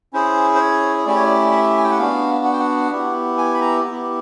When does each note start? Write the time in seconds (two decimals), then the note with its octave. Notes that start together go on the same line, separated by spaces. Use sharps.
0.13 C#4 E4 G#4 C5
0.55 C5
0.60 C#5
1.06 A3 C#4 E4 G4 D5
1.15 C#5
1.25 D5
1.52 E5
1.78 G#5
1.84 G5
1.91 F#5
1.98 B3 D4 F#4 F5
2.45 F#5
2.53 G5
2.60 F#5
2.92 B3 E4 G4
3.38 G#5
3.54 B5
3.61 A#5
3.84 B3 E4 G4